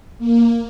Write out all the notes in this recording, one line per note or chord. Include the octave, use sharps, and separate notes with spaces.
A#3